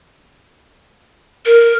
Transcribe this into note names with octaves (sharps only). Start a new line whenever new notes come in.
A#4